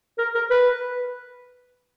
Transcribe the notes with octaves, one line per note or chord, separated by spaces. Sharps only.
A#4
A#4
B4